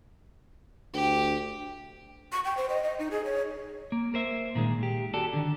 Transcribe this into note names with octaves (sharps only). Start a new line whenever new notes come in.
D2 G4
C#6
G5
C5
D#5
D#5
D#4
G#4
C#5
A#3
A#4 C5 E5
A#2 D#3 G#3
G4
F#4 G4 A4 D5
D3 D#3